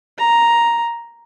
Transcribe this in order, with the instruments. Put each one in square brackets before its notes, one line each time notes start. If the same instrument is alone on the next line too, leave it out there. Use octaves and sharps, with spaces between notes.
[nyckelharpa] A#5